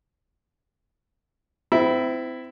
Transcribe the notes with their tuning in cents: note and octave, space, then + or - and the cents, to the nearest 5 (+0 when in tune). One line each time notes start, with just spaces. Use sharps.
C4 -30 E4 +0